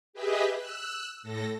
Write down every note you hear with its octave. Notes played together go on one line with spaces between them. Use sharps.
G4 G#4 B4 D#5 E5 B6
E6 F#6
A2 A4 A#6